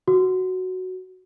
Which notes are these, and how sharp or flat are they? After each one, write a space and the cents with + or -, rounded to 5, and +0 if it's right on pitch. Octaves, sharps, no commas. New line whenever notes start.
F#4 +0